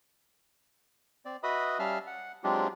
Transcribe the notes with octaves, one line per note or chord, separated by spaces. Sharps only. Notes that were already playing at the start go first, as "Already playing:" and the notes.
C4 D5
F#4 B4 D#5 E5 B5 D#6
G3 C#4 E5 F5 A5 F6
F#5
F#3 G#3 C4 D4 F4 G4